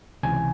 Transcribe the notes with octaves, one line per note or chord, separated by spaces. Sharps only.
C#2 C3 E3 G#5